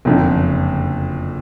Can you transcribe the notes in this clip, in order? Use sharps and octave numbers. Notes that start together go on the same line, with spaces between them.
F#1 F2 D3